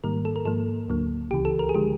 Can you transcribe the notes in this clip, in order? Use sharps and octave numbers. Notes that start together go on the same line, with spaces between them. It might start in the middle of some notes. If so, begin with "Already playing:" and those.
G#2 D#3 G3 A#3 A#4
A4
A#4
G#2 F3 A#3 A4
D2 D3 F#3 A#3
C#2 C#3 E3 G4
A4
A#4
G#4
D3 F3 G#3 G4